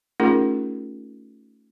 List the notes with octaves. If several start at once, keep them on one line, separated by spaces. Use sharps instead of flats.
A3 C#4 D#4 F4 G#4 A#4